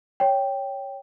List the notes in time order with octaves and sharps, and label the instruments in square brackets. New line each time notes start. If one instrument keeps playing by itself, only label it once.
[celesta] C#5 G5